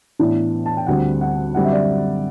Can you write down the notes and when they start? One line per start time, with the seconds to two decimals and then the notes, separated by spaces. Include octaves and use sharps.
0.19 A2 E3 B3 D4
0.66 A5
0.77 G5
0.87 D2 D3 G3 C4 F#5
1.21 F#5
1.55 F#2 D3 G3 C4 F#5
1.64 E5
1.72 D5